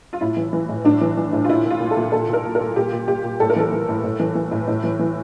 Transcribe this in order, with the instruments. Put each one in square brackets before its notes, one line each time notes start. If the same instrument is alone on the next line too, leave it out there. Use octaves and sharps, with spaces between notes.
[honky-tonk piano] F4
A2 E4
E3
E3
A2
A2 D4
E3
E3
A2
F4
A#2 E4
A#2
F4
A#2
A4
A#2
A#2 A4
A#2 A#4
A#2
A#4
A#2
A#2 G4
A#2
A#2 G4
A#2
A2 A4
A#4
E3 A4
E3
A2
A2
E3
E3
A2
A2
E3
E3